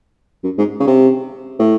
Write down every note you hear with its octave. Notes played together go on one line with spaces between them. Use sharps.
F#2
G#2
C#3
C3
A2